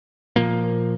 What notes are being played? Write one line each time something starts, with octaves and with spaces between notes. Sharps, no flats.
A#2 F3 A#3